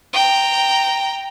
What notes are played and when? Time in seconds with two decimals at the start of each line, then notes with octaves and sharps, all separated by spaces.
0.13 G5 A#5